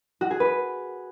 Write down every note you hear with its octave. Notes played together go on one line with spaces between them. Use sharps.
F#4
G#4
B4